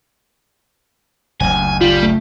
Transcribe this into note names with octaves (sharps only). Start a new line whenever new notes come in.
F#1 D2 G#5
G3 F4
A3